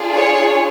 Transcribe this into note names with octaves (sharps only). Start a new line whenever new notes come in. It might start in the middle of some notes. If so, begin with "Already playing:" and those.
Already playing: D4 F4 G#4
C#5